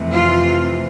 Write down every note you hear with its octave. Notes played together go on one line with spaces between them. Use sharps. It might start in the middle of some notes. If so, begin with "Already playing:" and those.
Already playing: F2 C3 E3 A3
F4